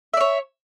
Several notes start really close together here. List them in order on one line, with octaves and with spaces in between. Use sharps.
E5 D5 C#5